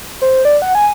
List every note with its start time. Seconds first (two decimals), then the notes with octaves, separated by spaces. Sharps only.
0.22 C5
0.45 D5
0.62 F#5
0.75 G#5